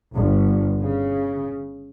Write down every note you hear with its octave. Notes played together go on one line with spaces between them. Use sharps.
G1
C#3